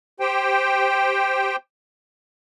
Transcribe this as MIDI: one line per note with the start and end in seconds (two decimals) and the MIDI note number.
0.20 1.56 67
0.20 1.56 72
0.20 1.56 79